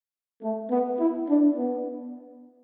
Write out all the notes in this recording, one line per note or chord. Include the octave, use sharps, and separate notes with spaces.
A3
B3
E4
D4
B3